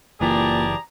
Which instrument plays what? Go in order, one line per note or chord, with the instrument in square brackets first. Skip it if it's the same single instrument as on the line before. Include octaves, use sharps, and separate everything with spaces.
[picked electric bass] F#1 E3 [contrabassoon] A#2 [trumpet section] G4 G#4 A#5 [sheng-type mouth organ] D5 A5